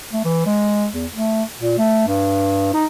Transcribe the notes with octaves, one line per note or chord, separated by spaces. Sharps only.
A3
E3
G#3
E2
A3
A#2
A3
G2
D#4